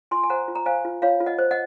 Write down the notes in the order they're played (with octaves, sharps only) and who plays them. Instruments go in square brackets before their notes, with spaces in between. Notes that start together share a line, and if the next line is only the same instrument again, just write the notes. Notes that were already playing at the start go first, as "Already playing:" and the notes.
[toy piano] F4 G#5 C6
G#5
C5 F#5 A#5
F4
A#5
C5 F5 G#5
F4
F4 C#5 F5
F4
D#5 F#5
C5
D#5 F#5